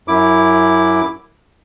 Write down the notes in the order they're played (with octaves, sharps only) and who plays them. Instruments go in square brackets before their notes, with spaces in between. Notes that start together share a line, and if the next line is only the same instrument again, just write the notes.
[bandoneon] F#2 E4 D6